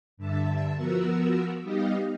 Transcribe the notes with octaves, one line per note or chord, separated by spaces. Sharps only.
G2 D3 E5 A5
F3 B3 F#4 A#4 E6
G3 B3 D#4 G4 D#5 F5